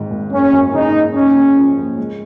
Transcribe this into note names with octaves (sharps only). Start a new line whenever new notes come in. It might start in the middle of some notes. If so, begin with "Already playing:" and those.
Already playing: G#1 G#2 D#3
G#1
F#1 C#4
F#2
C#3 D#4
F#1
D#2 C#4
C#3
F3
D#2
G#3